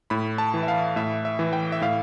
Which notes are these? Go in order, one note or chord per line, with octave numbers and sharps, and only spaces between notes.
A2 B5
A5
E3
E5
F5
A2 E5
E5
E3
G5
E5
A2 F5